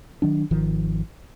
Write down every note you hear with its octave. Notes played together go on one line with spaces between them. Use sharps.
D#3 F#3 D4
G#1 D#3 F3